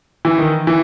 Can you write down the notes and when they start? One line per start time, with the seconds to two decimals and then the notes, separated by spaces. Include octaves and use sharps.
0.25 E3
0.38 D#3
0.67 E3